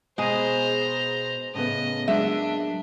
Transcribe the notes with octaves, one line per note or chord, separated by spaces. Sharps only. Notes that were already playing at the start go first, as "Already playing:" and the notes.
B2 G#3 G#4 C5 A#5
A2 C#3 B3 D#5
F#3 G#3 A#3 D4 E5